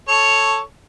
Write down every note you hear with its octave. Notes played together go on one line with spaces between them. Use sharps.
A4 C#5